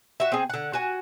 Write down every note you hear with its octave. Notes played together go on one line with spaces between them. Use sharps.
F#4 E5
C4 G#4
D3 F#5
F#4 G#5